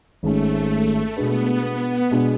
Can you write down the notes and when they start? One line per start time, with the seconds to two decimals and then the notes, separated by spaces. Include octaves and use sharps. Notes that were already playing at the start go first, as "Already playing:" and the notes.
0.22 G#1 G#2 G#3 A3 C#4
1.16 B2 G#3 B3 D4 G#4 B4
2.11 B2 G#3 D4 G#4 B4